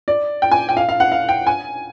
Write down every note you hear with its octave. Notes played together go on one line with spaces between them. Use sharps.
D5
G5
G#5
G5
F5
F5
F#5
F5
G5
G#5